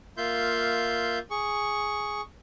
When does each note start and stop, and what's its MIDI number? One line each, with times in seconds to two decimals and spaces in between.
0.17 1.19 58
0.17 1.19 65
0.17 1.19 76
0.17 1.19 84
0.17 1.19 91
1.31 2.21 68
1.31 2.21 85